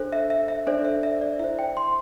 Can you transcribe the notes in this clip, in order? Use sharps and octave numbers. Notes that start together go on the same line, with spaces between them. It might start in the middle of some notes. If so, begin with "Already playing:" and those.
Already playing: D4 A4 C5
E5
E5
E5
D4 A4 C5 D5
E5
E5
D5
E4 C5 E5
G5
C6